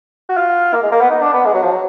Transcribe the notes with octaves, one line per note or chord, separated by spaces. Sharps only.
F#4
F4
A#3
G#3
A#3
B3
D#4
D4
B3
G#3
F#3
F3
F#3